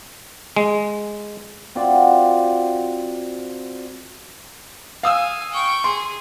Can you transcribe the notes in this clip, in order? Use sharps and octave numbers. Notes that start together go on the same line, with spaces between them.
G#3
C4 F4 F#4 D5
F5 G#5 D#6 E6
G5 C#6
G#4 C6